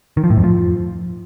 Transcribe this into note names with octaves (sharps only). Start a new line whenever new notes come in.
D#3
F3
A2
F2
F3